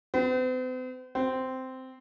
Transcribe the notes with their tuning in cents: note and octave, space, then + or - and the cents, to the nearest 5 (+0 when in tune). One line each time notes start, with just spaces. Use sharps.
C4 -45
C4 -10